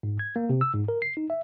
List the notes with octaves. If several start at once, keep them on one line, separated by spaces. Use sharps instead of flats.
G#2
G#6
A#3
C3
E6
G#2
A#4
C7
D#4
E5